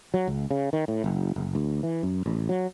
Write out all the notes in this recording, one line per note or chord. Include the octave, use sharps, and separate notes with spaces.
F#3
C#2
C#3
D#3
A2
F#1
F#1
D2
E3
F#2
A1
F#3